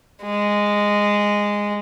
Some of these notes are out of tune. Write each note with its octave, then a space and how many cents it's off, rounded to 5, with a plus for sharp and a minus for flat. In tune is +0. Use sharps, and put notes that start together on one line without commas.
G#3 -10